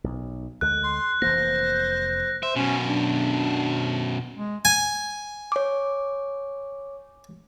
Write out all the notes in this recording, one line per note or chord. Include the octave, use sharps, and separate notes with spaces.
B1
D2 D3 G#3 F#6
C6
F1 E3 A#3 C5 A#6
C5 E5
F#2 B2 C#4
D4
G#3
G#5
C#5 D6